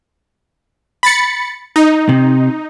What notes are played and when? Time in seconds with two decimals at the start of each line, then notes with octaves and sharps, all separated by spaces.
1.03 B5 A6 C#7
1.76 D#4
2.09 C3